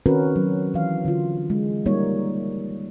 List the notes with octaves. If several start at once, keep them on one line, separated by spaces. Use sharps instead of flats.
D#3 C4 C#4 F#4 A#4 B4
F#3
E3 F5
D3 F4
G#3
G3 A#3 D#4 C#5